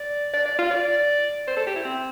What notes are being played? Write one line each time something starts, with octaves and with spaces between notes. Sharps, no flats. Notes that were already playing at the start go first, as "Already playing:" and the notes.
Already playing: D5
D5
D5
F4
D5
C5
A4
G4
E4
C4